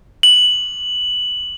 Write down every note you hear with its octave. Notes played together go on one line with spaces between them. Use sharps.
F#7